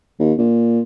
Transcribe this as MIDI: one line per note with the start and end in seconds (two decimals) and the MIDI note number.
0.19 0.33 39
0.38 0.80 46